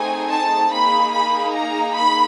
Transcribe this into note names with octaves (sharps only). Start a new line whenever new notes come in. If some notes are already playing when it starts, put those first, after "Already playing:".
Already playing: A3 C4 D#4 G#4 G#5
A5
A#3 D#4 G#4 B5
B5
A#5
B5